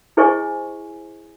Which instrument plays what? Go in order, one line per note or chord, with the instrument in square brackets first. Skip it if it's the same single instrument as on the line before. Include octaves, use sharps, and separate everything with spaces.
[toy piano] E4 G#4 C5 D#5 G#5 C#6